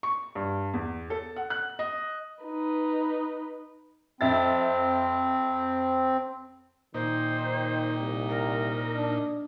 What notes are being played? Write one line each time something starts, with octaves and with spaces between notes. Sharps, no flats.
C#6
G2
E2
A4
F#5
F#6
D#5
D#4 B4
F2 C4 E5 A6
A#2 D#3 D#4 C5
C2
A#4
D4